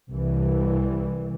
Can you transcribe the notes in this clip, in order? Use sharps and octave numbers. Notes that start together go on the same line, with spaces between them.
C2 E3 G3